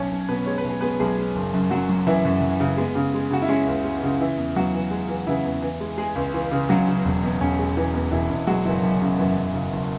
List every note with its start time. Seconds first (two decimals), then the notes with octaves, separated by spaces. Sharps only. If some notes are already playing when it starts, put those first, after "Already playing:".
Already playing: B1 C#4 C#5
0.11 B1
0.29 B2 B3 B4
0.46 G#3 C#5
0.58 B4
0.64 B1
0.69 G#4
0.81 G#3 B3 B4
1.00 B1 G#3 G#4
1.18 G#3
1.35 F#1
1.54 F#2
1.70 F#2 F#3 F#4
1.89 F#3
2.07 F#2 E3 E4
2.25 F#2
2.42 F#2
2.60 C#3
2.77 G#3 B3
2.95 C#3
3.14 G#3
3.31 C#3 F#4
3.42 E4
3.48 G#3 C#4
3.67 C#2
3.85 G#3
4.03 C#3
4.21 E3 E4
4.38 E2
4.55 E2 F#3 F#4
4.73 E3
4.91 G#3
5.09 E3
5.26 C#3 E3 E4
5.44 E2
5.62 E3
5.80 G#3
5.98 G#3 G#4
6.15 C#2
6.34 E3
6.51 C#3
6.69 C#3 F#3 F#4
6.88 C#3
7.05 E1
7.23 E2
7.40 E1 C#4
7.59 G#3
7.77 E3
7.94 E2
8.11 E1 E3 E4
8.30 E1
8.47 F#3 G#3 F#4
8.65 F#1 E3 E4
8.83 F#2 C#4
9.01 C#3
9.18 F#2 E3 E4
9.37 F#2
9.54 C#3
9.73 F#1